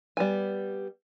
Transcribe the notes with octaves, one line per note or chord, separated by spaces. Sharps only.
G3 B3 G#5